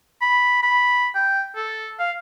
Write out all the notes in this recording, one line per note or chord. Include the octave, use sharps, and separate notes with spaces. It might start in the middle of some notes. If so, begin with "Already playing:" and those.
B5
B5
G5
A4
F5